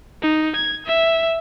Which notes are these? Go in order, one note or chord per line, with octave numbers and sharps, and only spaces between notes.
D#4
G#6
E5